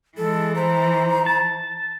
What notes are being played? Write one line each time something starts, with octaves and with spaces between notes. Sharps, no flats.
E3 G#3 A4
C5 A#5
A5